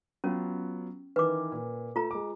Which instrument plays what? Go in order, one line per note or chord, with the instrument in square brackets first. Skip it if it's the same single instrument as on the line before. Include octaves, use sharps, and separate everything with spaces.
[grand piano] F#3 B3 F4 [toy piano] C#4
[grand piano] D#3 E3 [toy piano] B4 D6
[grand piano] A#2
[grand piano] A3 [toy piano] F4 A#5
[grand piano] G#3 D6